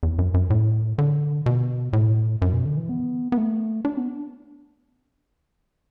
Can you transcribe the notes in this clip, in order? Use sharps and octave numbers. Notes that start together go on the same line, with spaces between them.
E2
F#2
F#2
A2
D3
B2
A2
F#2
B2
D3
E3
B3
B3
A3
D4
B3